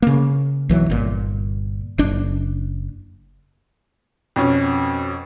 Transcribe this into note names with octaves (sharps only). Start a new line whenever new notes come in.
C#3 A#3
B1 E3 F#3
G1 A#2
F#1 D4
F2 B2 C#4